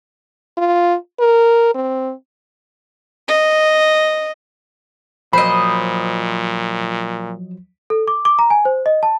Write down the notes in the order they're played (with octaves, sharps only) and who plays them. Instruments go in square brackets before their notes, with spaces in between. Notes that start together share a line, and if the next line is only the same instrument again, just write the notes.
[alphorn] F4
A#4
C4
[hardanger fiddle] D#5
[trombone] A#2 [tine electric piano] F3 F#3 [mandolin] C5 D#5 [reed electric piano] B5
[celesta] A4
D6
D6
A#5
G#5
C5
D#5
A5